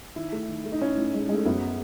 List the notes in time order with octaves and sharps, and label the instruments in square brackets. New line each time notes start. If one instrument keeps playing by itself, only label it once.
[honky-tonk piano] D#3 [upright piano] E4
[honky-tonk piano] A3
D#3
A3
[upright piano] D#4
[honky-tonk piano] A2 [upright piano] C#4
[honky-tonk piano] A2
G#3
[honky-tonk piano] G#3 [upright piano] A3
[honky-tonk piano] F#2 [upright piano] B3